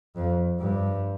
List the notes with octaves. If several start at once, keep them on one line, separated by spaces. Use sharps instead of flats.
F2
G2